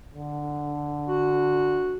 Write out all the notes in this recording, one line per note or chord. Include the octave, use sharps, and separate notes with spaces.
D3
F#4